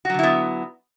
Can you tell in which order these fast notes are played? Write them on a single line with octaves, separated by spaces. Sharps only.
F#4 F#3 D3 E4 B3